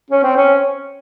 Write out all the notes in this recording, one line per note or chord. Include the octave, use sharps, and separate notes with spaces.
C#4
C4
C#4